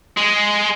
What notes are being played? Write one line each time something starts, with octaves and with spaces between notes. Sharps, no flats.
G#3